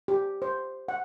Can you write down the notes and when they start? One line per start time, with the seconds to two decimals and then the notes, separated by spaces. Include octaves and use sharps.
0.08 G4
0.42 C5
0.88 F#5